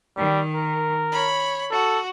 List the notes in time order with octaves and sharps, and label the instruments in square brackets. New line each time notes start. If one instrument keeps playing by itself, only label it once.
[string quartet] D#3 [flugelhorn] G3
[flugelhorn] A#4
[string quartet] C#5 B5
[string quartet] F#4 [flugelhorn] A4